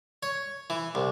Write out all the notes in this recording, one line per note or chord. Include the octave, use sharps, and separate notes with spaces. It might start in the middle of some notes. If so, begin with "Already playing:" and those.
C#5
E3
C2